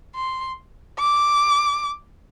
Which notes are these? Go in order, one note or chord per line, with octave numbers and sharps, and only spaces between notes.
C6
D6